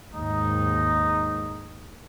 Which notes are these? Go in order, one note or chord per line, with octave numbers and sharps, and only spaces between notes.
D#2 G#2 D#4